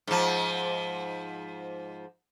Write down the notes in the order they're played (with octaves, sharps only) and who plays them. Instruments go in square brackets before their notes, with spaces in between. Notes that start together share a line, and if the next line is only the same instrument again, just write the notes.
[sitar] G#2 F3